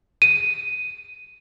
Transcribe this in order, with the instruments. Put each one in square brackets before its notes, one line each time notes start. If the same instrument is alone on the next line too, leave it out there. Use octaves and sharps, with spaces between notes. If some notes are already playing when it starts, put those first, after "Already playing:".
[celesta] D#7